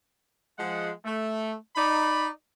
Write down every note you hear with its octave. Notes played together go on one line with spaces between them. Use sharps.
F3 G#3 F#5
A3
D#4 D5 B5